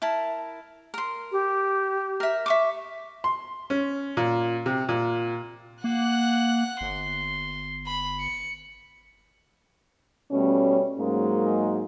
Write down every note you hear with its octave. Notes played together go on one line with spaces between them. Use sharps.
E4 A#4 A5
A#4 C6
G4
A#4 E5
E5 C#6 D6
C6
C#4
A#2
C3
A#2
A#3 F#5 F#6
G1 C6
B5
C#7
B2 G3 A3 C#4
G#2 F#3 G#3 A#3